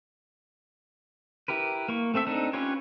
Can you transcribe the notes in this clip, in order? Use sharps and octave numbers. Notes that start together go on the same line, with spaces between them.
E4 G4 A#4 B4
A#3 C#6
A3 C4 A4 E5
C4 D4 D#4 A4
C#4 F4 G4 B4 C#5